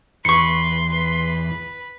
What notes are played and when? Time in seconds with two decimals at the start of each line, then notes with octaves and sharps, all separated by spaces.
0.25 E2 B4 C6 C#6 C#7
0.91 B4